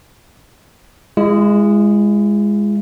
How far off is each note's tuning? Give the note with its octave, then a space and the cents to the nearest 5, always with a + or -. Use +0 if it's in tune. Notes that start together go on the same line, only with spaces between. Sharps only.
G#3 -10 E4 +40